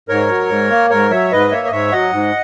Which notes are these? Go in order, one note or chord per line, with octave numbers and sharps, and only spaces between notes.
G#2 A#4 C#5
F#3
G#2
A#3
G#2 A#4 C#5
F#3 C#5 E5
G#2 B4 D#5
A#3 C#5 E5
D#5
G#2 C#5 E5
F#3 D#5 F#5
G#2